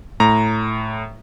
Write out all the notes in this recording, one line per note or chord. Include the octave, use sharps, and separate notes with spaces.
A2 A#5